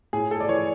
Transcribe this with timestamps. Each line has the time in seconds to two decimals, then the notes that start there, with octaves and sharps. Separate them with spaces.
0.13 A2 G#4
0.31 A4
0.40 D5
0.49 E3 C#5